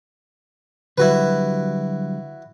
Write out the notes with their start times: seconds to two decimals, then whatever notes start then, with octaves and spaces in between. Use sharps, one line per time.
0.98 D3 F#3 G3 E4 F#4 B4